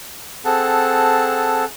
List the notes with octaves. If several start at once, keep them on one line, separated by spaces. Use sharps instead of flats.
C4 G#4 A4 F#5 A5